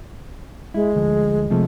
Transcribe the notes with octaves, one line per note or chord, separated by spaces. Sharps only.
G#3 E4
D2 F3
C3 F3 A3